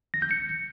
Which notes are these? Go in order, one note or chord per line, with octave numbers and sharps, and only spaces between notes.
A#6
G6
C#7